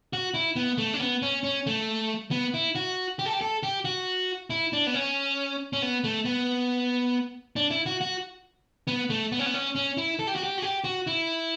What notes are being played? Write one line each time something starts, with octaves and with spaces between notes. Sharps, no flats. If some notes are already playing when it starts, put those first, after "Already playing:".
F#4
E4
B3
A3
C#4
B3
C#4
C#4
A3
B3
E4
F#4
G4
A4
G4
A4
G4
F#4
E4
D4
B3
C#4
C#4
B3
A3
B3
D4
E4
F#4
F#4
B3
A3
B3
C#4
B3
C#4
C#4
E4
A4
G4
F#4
G4
F#4
G4
F#4
E4